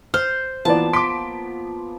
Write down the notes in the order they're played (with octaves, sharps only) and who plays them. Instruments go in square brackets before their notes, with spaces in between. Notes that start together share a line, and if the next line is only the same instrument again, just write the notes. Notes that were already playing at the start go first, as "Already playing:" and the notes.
[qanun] C5 [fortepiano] F6
[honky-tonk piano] E3 B4 D5 [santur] F3 A#3 B3 [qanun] A5
[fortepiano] C6 D6 [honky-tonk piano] B6 D7